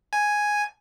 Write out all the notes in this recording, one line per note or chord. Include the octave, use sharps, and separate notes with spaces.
G#5